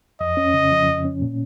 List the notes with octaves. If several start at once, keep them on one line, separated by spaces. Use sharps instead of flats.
F2 D#5
C#4
C#3
F3
F2
C#4
A#2